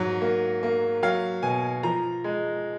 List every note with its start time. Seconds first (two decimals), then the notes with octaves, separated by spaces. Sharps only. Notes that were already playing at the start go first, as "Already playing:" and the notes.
Already playing: G#2 F#3
0.21 A#3
0.63 A#3
1.03 F#3 F5
1.43 B2 G#5
1.83 F3 A#5
2.24 G#3